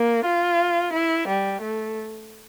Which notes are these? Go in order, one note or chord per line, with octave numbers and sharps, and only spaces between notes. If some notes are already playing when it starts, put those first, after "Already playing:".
Already playing: A#3
F4
E4
G3
A3